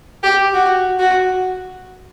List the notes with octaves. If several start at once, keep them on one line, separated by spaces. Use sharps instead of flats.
G4
F#4
F#4